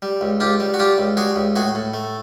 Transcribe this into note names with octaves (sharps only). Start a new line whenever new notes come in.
G3
C#2
C#2 F4 G4
G3
F#4
G3 F4 G4
C#2
G3 F#4 G#4
C#2
A2 F#4 G#4
A2
A3